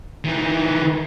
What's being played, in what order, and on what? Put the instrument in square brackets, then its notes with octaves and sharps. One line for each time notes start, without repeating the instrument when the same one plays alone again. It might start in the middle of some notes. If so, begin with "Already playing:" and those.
[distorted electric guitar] D#3 E3